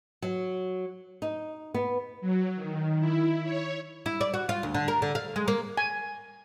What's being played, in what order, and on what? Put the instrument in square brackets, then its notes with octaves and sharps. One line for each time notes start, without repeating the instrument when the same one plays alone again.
[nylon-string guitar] F#3
D#4
B3
[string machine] F#3
D#3
E4
C#5
[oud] E4
D5
F#4
F4
D2
D3
A#4
D3
F5
G#3
A#3
[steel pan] G#5